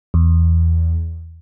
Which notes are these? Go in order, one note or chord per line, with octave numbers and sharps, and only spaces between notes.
E2